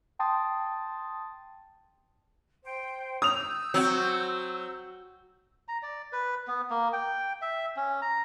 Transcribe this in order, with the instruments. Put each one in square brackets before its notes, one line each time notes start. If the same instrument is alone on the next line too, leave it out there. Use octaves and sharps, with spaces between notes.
[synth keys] G5 A5 C6 D#6 A6
[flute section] C5 G5
[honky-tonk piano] D#6 F7 [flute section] E6 G6
[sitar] F#3 [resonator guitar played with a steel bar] C4 F#4
[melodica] A#5
D5
B4
B3
A#3
G5
E5
C#4
A#5